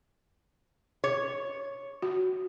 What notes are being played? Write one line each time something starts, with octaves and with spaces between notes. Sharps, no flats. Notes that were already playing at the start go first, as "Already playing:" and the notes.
C#5
F#4